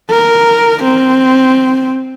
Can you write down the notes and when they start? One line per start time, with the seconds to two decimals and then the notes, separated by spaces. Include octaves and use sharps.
0.10 A#4
0.84 C4